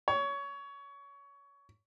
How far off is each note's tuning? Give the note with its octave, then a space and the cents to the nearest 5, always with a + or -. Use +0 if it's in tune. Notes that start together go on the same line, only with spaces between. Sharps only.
C#5 +20